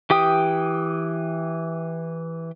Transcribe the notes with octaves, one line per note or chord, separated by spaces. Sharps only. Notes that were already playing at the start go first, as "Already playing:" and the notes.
E3 G4 G5 D#6